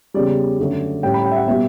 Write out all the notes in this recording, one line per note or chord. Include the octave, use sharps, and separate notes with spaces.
E2 C#3 G3 D5
F#2 D3 A3 C#4
A2 G3 C#4 G5
B5
G5
E5
F#5
B2 G3 B3 E5